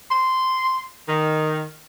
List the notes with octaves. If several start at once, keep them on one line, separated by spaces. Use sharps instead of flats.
C6
D#3